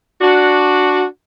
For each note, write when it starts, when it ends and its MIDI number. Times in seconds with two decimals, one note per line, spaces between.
0.21 1.04 62
0.21 1.04 66